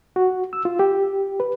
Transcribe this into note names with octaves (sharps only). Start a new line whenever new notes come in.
F#4
E6
F4
G4
B4